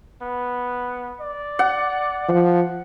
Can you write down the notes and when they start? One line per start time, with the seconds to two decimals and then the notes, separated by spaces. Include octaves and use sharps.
0.23 B3
1.21 D5
1.59 F#5
2.29 F3